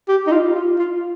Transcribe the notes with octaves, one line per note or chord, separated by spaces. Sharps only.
G4
D#4
F4
F4
F4